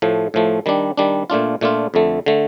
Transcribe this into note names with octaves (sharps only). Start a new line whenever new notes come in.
A2 F3 A3
A2 F3 A3
D#3 G3 D4
D#3 G3 D4
A#2 A3 D4 F4
A#2 A3 D4 F4
F2 D3 A3
D3 A3